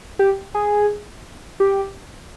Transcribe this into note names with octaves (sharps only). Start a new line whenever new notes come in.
G4
G#4
G4